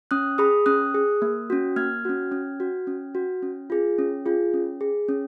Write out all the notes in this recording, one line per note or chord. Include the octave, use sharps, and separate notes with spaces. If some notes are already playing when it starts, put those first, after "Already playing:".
C#4 D#6 F#6
G#4 B5 D#6
C#4 D#6 F#6
G#4
A#3
C#4 F#4
A#3 F6 G#6
C#4 F#4
C#4
F#4
C#4
F#4
C#4
F4 G#4
C#4
F4 G#4
C#4
G#4
C#4